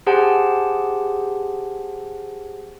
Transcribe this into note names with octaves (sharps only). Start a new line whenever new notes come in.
G4 G#4 C5 F#5 G#5 A5